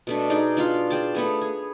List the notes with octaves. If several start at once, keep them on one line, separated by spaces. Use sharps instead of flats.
B2 A3 D4
D#4 G#4 D5
D4 F4 F5
G#4 G5 A5
A3 B3 G#4
G#4